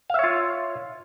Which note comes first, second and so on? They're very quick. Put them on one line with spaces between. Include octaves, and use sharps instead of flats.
F5 E5 C#5 F4